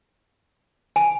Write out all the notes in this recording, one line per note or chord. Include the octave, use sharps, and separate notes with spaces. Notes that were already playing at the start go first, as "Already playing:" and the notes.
G#5